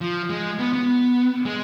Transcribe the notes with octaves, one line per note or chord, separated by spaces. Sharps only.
F3
G#3
B3
B3
G#3